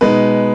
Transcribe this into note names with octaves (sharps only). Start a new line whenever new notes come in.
B2 G#3 D#4 B4